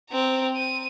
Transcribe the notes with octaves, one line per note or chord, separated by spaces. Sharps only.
C4 A#5
D#7